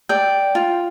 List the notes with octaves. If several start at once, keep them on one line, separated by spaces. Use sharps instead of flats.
D5 G5
F4